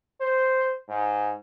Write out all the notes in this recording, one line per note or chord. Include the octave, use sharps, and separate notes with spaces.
C5
G#2